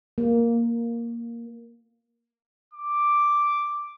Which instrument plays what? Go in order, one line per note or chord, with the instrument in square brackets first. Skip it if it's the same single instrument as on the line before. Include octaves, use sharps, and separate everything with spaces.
[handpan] A#3
[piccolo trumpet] D6